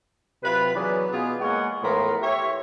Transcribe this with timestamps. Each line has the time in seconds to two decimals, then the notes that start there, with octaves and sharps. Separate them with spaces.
0.43 C3 F#3 F4 B4
0.75 E3 F#3 B3 C#4 G#4 D5
1.12 B2 B3 F4 G#4
1.41 G#3 A#3 A#4 C#5 F#5 G#5
1.83 A2 E3 F3 B3 A#4 C6
2.22 G4 C#5 E5